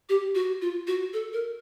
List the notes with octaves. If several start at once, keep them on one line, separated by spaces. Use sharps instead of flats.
G4
F#4
F4
F#4
A4
A#4